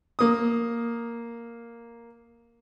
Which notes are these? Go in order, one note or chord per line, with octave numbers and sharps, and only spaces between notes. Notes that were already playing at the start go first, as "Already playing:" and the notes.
A#3 D#6